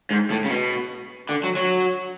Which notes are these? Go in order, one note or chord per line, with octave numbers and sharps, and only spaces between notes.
G#2
A2
C#3
B2
D3
F#3
F#3